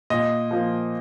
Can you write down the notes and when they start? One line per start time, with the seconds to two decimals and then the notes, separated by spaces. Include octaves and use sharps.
0.10 A#2 D#5
0.51 F3 A#3